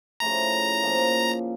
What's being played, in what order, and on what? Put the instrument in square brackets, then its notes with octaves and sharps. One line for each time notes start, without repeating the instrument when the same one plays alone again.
[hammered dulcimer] C#3 F3 A3 E4 [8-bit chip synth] A#5
[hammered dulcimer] A#2 F3 A#3